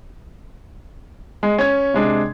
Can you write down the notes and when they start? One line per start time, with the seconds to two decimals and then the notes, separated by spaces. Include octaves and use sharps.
1.43 G#3
1.59 C#4 G#6
1.94 C3 G#3 D4